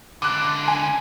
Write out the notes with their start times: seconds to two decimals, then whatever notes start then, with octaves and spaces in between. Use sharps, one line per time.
0.22 C#2 D3 D6 F#6
0.68 G#5